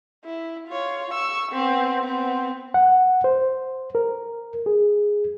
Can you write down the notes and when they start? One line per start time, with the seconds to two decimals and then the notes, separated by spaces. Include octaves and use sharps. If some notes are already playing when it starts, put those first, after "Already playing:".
0.25 E4
0.68 F4 C#5
1.12 C#6 E6
1.52 B3 C4
2.04 B3 C4
2.74 F#5
3.24 C5
3.95 A#4
4.66 G#4